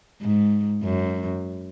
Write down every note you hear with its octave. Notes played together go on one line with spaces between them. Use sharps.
G#2
F#2